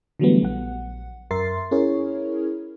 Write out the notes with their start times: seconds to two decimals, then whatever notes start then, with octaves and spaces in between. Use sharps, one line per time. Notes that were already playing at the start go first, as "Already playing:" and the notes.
0.19 D3 E3 F#3 G3 A3 B3
0.42 A#1 F#5
1.31 F#2 A#4 E5 C6 A6 C7
1.71 C#4 E4 G#4 A#4 C#5